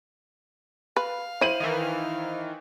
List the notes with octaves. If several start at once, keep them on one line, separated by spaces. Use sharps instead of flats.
B4 F5
E4 C5 D#7 F#7
D#3 E3